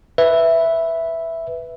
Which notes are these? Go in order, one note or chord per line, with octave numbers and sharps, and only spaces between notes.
B4 E5